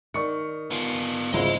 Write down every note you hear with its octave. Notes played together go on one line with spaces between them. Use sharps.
D#3 D5 C#6 C#7
B3 F4
G#1 D2 C#3 F3 E4 F4 D#5 C6